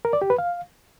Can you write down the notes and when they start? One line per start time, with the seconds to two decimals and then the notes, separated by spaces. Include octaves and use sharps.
0.05 A#4
0.13 D5
0.22 G4
0.30 B4
0.38 F5